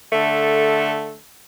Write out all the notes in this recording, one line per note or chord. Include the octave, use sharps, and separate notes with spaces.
D3 A3 A4